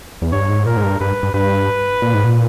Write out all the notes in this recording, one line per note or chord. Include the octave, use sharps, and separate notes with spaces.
E2
G2 C#5
G#2
A#2 A#4
G#2
G2
G2 B4
G2
G2 B4
A#2
G#2
A#2